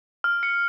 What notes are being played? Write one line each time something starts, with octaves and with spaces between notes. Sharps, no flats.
F6
C#7